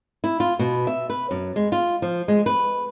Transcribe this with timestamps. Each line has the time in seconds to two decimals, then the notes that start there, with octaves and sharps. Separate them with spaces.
0.24 E4
0.40 F4
0.59 B2
0.87 E5
1.10 B4
1.31 F#2
1.56 G#3
1.72 F4
2.02 F3
2.28 G#3
2.46 B4